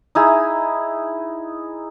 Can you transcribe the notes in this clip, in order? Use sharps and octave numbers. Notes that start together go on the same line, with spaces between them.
D#4 E4 G#4